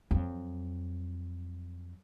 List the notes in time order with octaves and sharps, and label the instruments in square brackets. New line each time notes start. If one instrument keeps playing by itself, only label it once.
[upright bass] F2 F#3